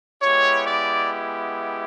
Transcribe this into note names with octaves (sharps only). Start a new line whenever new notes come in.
G#3 B3 E4 G4 C#5
D5